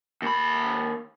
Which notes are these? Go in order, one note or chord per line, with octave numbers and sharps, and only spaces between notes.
D#2 B5